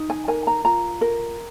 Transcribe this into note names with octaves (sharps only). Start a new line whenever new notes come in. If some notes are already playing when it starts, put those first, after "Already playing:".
Already playing: D#4
G#5
A#4 G#5
A#5
F4 A#5
A#4